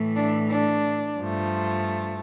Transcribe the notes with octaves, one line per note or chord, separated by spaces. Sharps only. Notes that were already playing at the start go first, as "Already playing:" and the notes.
Already playing: A2 E3 A3
D4
D4
G2 F3 A3